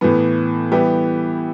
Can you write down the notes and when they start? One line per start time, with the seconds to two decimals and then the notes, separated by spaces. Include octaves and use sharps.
0.01 A2 E3 B3
0.72 E3 G3 B3 E4 G4